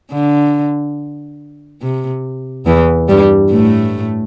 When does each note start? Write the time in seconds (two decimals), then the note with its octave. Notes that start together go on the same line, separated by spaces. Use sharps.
0.12 D3
1.82 C3
2.66 E2 E3
3.08 G2 G3
3.51 A2 A3